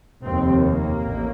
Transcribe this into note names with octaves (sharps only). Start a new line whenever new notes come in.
F1 D#2 C4
A#3
A1 A2